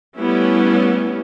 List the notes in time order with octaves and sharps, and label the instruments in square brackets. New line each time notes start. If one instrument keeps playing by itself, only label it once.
[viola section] G3 A3 B3 C#4 E4